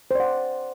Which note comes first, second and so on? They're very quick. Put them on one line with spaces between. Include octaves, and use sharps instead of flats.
C5 D5 F#5